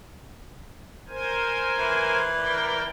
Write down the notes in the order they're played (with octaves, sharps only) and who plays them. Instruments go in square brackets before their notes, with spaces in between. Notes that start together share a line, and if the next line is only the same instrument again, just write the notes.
[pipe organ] A#4 C5 G#5
[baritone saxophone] E3
[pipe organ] A#4 D5 G5